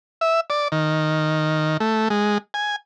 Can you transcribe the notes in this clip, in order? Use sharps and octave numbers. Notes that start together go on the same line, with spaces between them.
E5
D5
D#3
A3
G#3
G#5